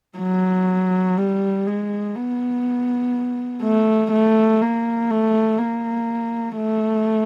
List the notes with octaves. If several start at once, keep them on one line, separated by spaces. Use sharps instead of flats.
F#3
G3
G#3
B3
A3
A3
A#3
A3
A#3
A3